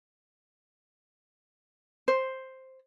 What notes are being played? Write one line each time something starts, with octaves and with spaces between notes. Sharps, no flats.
C5